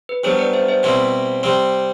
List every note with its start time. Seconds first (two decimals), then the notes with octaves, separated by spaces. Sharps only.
0.09 B4
0.24 G2 F#3 B3 C5
0.39 B4 D5
0.53 C5 E5
0.68 C5 E5
0.83 B2 G3 C4 E4 C5
1.43 C3 G3 C4